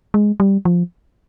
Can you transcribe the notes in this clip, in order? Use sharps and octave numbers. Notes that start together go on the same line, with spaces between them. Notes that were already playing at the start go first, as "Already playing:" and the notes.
G#3
G3
F3